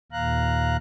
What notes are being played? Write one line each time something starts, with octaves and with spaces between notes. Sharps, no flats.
D#2 A#2 F5 A#5 F#6